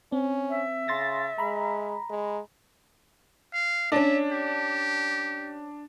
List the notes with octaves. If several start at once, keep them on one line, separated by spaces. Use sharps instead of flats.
C4 C#4
E5
C#3 C6 A6 A#6
G#3 A#5 B5
G#3
F5
C#4 D4 D5 E5
G4